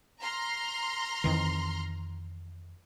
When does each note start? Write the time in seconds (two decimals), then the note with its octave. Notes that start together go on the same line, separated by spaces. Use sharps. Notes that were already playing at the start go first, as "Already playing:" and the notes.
0.20 A#5 C6 F6
1.24 F2 D#3 E3